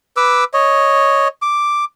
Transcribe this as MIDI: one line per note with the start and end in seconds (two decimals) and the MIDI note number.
0.17 0.44 71
0.17 0.44 86
0.17 0.44 88
0.54 1.28 73
0.54 1.28 75
1.42 1.85 86